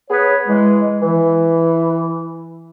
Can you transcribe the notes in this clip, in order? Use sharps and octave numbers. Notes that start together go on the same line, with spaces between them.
B3 G#4 B4 C#5
E3 G#3
E3